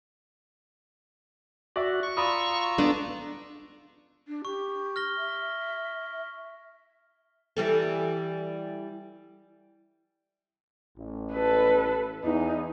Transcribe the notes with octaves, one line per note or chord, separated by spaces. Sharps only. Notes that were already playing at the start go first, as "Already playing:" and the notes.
F#4 D5 E5
C#6
F4 D5 A#5 B5 D#6 E6
A3 B3 D4
D4
G4 C#6
F6 A#6 G7
E5
E3 G3 A4
A1
A4 B4
E2 D#4